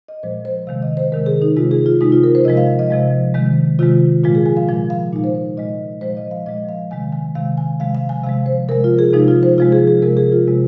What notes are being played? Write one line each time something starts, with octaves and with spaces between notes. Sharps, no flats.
D#5
A#2 F3 G#3 C5
C5
C3 D#3 G#3 F5
D#5
C5
C3 D#3 G#3 A#4
G#4
D#4
C3 G#3 F4
G#4
F4
C3 G#3 D#4
F4
A#4
C5
C3 F3 G#3 D#5
F5
D#5
C3 F3 G#3
C3 D#3 G#3
C3 D#3 G#3 F4
A#2 F3 G#3 F4
G#4
G#5
F5
A#2 F3 G#3 F5
F5
A#2 G#3 D#4
C5
C5
A#2 G#3 D#5
A#2 F3 G#3 C5
D#5
F5
A#2 F3 G#3 D#5
F5
C3 D#3 G#3 G#5
G#5
C3 D#3 G#3 F5
G#5
C3 F3 G#3 F5
F5
G#5
C3 F3 G#3 F5
C5
C3 F3 G#3 A#4
F4
G#4
C3 F3 G#3 D#4
F4
C5
C3 F3 G#3 F4
G#4
G#4
C3 F3 G#3 A#4
G#4
F4
C3 G#3